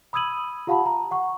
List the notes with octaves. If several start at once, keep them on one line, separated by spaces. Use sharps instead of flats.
B5 D#6 E6 G#6 D#7 F#7
F4 G4 F5 F#5 A5 B5
A#5
F#5 C#6